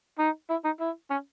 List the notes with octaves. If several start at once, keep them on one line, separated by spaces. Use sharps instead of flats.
D#4
E4
D#4
E4
C#4